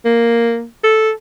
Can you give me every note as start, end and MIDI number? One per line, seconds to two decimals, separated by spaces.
0.05 0.65 58
0.84 1.12 69